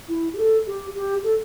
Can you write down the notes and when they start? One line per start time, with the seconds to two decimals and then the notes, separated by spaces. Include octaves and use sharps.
0.08 E4
0.33 G4
0.37 A4
0.66 G4
0.95 G4
1.24 A4